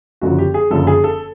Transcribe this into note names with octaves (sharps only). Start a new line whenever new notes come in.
F#1 F#2 D3 F3 F#4
G4
G#4
F#1 F#2 D3 F3 A4
G#4
A4